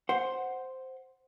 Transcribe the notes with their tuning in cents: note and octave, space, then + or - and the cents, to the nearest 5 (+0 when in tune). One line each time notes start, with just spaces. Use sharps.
C5 +0 F#5 +0